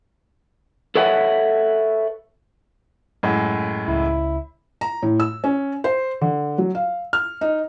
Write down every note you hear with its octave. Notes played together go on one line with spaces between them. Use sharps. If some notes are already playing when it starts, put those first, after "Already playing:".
A4 B4 C#5 E5 F#5
F#2 A2 G#3
C#2 E4
A#5
A2
E6
C#4
C5
D3
F#3
F5
F6
D#4